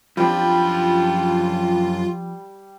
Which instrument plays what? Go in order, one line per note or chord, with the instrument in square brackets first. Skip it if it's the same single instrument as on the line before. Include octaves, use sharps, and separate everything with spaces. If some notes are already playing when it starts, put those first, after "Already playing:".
[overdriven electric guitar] F#2 G5 [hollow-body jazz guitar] F3 C4 D4 [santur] G3 [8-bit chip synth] F4